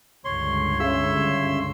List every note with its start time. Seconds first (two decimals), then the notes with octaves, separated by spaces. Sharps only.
0.25 C#2 G2 D3 C#5 C6
0.80 C#3 E5 C6 E6